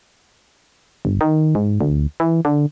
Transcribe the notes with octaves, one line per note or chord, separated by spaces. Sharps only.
G1
D#3
G#2
D2
E3
D3